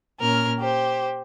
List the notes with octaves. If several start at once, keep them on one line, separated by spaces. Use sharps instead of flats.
A#2 C#4 A#4 F6
G4 C5